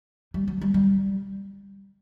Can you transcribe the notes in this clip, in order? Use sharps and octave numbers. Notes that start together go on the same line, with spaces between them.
G3
F#3
G3
G3